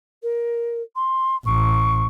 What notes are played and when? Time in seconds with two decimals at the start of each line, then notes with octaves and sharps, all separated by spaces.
0.22 A#4
0.95 C6
1.46 A1 C#6